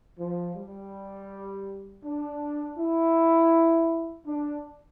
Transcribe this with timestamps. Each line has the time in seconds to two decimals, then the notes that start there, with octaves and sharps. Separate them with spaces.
0.19 F3
0.56 G3
2.04 D4
2.78 E4
4.27 D4